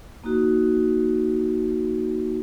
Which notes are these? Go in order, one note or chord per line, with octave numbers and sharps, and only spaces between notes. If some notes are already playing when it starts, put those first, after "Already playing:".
A#3 D#4 F#4